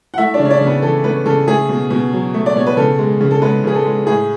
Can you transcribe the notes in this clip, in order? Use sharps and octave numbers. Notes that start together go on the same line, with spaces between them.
F#5
A3 E4 E5
D4 D5
C#3
C#5
D4 D5
C#3
B3 B4
E3 A4
A3 B3 B4
C#3 A4
A3 G#4
B2
B2
F#3
A3
D5
B2 C#5
B4
C#3 A4
G#3
C#3
A4
G#3 B3 B4
C#3 G#4
A4
G#3
A2 G#4